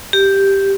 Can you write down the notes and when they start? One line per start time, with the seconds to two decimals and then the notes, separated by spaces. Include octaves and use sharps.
0.13 G4